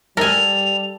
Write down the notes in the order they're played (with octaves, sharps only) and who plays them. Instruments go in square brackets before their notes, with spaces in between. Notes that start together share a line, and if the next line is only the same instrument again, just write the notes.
[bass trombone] G3 [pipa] A4 [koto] A#4 G#5 [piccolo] F7